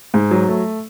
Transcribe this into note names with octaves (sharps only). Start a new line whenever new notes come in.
G#2
F#3
A3